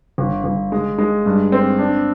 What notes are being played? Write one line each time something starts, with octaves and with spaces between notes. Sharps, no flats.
G1
G1
G#3
G#3
G2
C4
D4